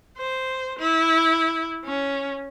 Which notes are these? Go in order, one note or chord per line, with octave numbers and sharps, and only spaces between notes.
C5
E4
C#4